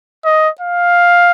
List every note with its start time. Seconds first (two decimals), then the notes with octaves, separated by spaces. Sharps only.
0.25 D#5
0.61 F5